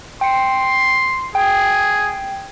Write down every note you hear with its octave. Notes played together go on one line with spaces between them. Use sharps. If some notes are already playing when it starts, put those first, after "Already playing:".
G5 C6 C#7
G#4 G5